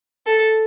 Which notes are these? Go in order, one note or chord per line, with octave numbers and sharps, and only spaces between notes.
A4